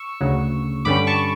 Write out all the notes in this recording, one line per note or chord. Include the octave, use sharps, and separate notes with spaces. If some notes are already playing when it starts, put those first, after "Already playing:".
Already playing: C#6 E6
D2 C#3 F#3
G2 D3 G3 C#4 B5 D6
A5 C#6